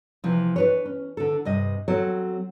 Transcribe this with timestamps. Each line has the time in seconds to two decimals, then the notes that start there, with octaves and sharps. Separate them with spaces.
0.24 C3 E3 F3
0.56 D4 B4 C#5
0.85 C#4
1.17 D3 A4
1.45 G2 C3 D#5
1.88 F#3 C4 A4 C#5